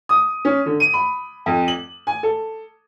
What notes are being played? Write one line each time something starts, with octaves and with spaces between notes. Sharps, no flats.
D#6
C#4
D3
D#7
B5
F2
F#7
G#5
A4